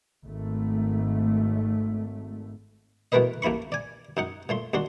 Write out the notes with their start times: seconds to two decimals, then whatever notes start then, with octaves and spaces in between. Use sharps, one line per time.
0.22 G#1 A3
3.12 B2 E3 A3 A#4 B4 D#5
3.42 A1 A#3 E4 B5 C#6
3.72 D5 G#5
4.17 F#2 D#4 F#5
4.49 A#2 A3 C6
4.74 D#2 D4 F#4 C6